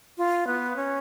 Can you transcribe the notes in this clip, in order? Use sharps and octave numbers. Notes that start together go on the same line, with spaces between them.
F4
B3
C#4